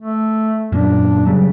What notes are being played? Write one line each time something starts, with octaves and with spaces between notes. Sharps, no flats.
A3
F#2 A#2 D4
C#3 F#3 G3